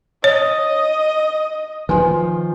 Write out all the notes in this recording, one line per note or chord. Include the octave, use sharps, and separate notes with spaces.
C#5 D#5
D#3 F3 B4 G#5 C6